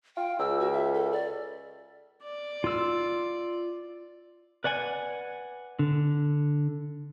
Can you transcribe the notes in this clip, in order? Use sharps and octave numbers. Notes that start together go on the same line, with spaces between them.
F4 G5
C#2 E6
F#4
E5
A4
D5
D5
F4 E6
B4 D5 F#5 G#5
D3